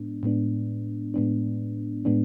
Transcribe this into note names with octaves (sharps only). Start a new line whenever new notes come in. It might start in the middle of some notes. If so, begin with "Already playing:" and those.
Already playing: A2 G#3 B3 D4
A2 G#3 B3 D4
A2 G#3 B3 D4
A2 G#3 B3 D4